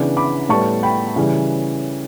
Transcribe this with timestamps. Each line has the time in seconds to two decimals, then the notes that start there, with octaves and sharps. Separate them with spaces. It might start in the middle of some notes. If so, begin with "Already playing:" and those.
Already playing: C#3 E3 B3 D4
0.17 B5 D6
0.49 A2 G3 B3 A5 C#6
0.83 G5 B5
1.16 C#3 E3 G3